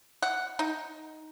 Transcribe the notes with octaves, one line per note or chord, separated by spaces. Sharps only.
F#5
D#4